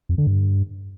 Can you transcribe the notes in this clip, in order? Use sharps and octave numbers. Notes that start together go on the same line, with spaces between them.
F2
D3
G2